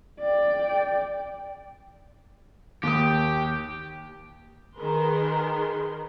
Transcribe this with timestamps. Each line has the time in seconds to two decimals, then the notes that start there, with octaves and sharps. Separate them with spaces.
0.21 D5 G5
2.83 D#2 G4 D#6
4.77 D#3 G#4 A#4 B4 C6